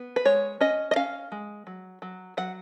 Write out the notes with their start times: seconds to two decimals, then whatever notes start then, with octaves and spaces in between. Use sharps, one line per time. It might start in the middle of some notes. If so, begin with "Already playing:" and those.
Already playing: B3
0.16 B4
0.25 G#3 C#5
0.61 C#4 D#5
0.91 D#5
0.96 C#4 F5
1.32 G#3
1.67 F#3
2.02 F#3
2.37 F#3 F#5